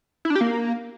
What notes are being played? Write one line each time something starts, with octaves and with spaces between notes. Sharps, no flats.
E4
D4
G4
A#3